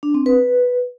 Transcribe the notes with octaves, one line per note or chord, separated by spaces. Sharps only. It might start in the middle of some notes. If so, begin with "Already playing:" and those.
D4
C4
B4